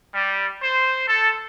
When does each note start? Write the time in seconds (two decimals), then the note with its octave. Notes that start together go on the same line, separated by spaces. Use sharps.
0.15 G3
0.63 C5
1.08 A4